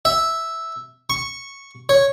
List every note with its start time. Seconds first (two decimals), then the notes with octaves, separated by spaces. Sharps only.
0.05 E5
1.10 C#6
1.89 C#5